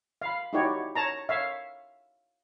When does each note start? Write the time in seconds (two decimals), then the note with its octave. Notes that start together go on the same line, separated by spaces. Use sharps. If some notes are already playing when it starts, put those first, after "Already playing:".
0.22 F5 B5
0.53 D#4 E4 F#4 G4 C#5 D5
0.95 C#5 A5 A#5
1.29 C#5 E5 F5